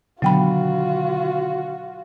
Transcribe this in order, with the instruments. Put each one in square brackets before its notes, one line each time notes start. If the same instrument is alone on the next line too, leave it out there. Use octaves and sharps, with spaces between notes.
[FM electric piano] B2 D3 D#3 [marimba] F#3 G5 B5 [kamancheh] F4 F#4